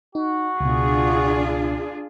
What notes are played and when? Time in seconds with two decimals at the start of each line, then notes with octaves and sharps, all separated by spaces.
0.15 D#4 F#4
0.61 C#2 B2 D4 F4 G#4